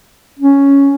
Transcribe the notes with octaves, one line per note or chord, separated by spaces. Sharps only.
C#4